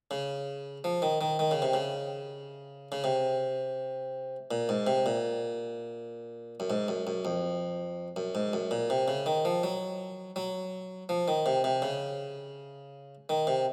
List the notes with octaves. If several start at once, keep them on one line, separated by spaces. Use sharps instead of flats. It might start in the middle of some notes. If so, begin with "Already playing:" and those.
C#3
F3
D#3
D#3
D#3
C#3
C3
C#3
C#3
C3
A#2
G#2
C3
A#2
F#2
G#2
F#2
F#2
F2
F#2
G#2
F#2
A#2
C3
C#3
D#3
F3
F#3
F#3
F3
D#3
C3
C3
C#3
D#3
C3